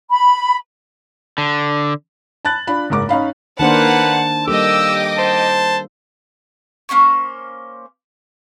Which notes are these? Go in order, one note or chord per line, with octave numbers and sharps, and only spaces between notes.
B5
D3
A5 B5 F#6 A6
D4 F4 B5
F#1 G#2 A#4 D6
C#4 D#4 F5 B5
D#3 A#3 D4 B4 C5 F#5 A5
G3 A#3 G4 A4 D#5 G5 D6 E6
C5 A5
A#3 C#4 C5 C#6